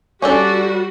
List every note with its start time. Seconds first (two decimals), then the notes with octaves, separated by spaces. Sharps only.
0.22 G3 C#4 D4 F#4 A4 D5